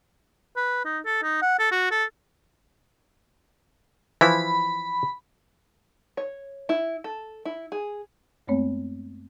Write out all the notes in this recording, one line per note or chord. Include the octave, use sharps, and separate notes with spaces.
B4
D#4
A4
D#4
F#5
A4
F#4
A4
E3 F3 E4 B5
C#5
E4
A4
E4
G#4
F#2 G#3 A3 B3 C4 C#5